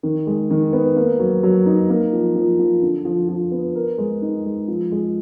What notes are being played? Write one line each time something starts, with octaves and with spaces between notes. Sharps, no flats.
D#3
G#3
D#3
B3
A#3
F#3
F#3
D#4
A#3
F3
F3
F3
D3
F3
F3
B3
A#4
G#3
D#4
G#3
F3
G#3